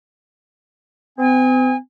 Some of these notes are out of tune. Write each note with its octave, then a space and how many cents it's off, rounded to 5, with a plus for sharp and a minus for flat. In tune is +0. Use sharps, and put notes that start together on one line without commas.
C4 -45 G#5 -30